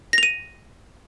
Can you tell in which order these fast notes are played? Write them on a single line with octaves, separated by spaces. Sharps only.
A#6 F7 D#7